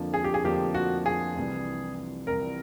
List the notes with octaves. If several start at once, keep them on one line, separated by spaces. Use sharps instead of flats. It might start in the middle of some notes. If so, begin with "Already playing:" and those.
Already playing: F2 D3 F3 A#3
G#4
G4
G#4
F2 D3 F3 A#3 G4
F#4
G#4
C2 C3 E3 G3
C2 C3 E3 G3 A#4